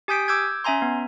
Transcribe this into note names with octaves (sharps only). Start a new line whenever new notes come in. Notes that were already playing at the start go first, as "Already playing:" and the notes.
G4 G#5 D#6 G6 B6 D7
D6 E6 G6 G#6
C#4 E5 G#5 A#5 C6
B3